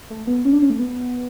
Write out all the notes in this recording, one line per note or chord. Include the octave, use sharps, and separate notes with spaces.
A3
B3
C#4
D4
C#4
A3
B3